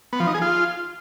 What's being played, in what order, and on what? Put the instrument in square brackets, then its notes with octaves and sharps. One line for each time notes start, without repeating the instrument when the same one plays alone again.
[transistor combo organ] B3
F3
D#4
G#4
F4